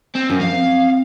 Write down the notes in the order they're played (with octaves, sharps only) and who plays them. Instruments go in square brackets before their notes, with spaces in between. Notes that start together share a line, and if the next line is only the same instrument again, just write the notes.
[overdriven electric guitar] C4
[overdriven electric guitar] F#2 [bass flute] C#4
[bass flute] F3 [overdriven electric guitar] F5
[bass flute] C4